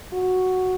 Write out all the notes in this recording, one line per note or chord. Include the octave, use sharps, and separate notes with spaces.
F#4